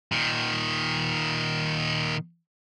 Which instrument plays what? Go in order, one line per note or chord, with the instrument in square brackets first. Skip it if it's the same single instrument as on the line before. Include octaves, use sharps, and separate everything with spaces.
[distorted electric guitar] A#2 D#3